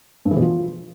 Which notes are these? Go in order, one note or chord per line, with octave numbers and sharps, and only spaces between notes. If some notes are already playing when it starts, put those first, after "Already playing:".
G2
E3
B2
F3